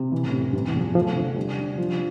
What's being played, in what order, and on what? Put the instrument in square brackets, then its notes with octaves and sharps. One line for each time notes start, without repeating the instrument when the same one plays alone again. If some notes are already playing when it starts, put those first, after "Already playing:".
Already playing: [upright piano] C3
[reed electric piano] B2 [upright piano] E3
[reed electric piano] A2
[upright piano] C3
[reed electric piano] F2
[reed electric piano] G2 [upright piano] C3
[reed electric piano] E3
[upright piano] E2
[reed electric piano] F3
[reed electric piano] F3 [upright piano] A3
[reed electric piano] C3
[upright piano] D3
G3
D3
F3